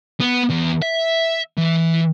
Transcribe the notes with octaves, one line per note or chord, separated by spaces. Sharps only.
B3
E2
E5
E3